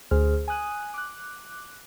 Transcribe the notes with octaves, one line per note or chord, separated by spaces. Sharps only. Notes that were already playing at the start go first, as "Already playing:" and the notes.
D2 G#4 C5 F6
G#5 D#6 F#6 D#7
D6 F#6